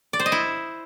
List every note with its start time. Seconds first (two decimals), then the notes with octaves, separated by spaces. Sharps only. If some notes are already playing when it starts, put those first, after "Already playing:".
0.13 D5
0.20 C5
0.26 D#5
0.32 E4